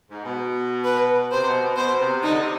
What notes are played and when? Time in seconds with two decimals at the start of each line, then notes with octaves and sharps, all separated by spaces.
0.09 G#2
0.24 B2
0.84 B4
1.31 C3 C5
1.46 B2
1.61 B2
1.76 B2 C5
1.99 C3
2.22 D3 D#4
2.38 C3